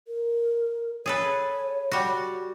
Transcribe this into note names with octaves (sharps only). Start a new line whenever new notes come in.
A#4
G#4 A4 B4 C#5
G3 F#4